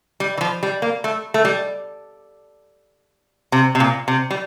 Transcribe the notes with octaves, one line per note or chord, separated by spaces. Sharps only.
G3
E3
F3
G3
A#3
A3
A3
G3
C3
C3
A#2
C3
G3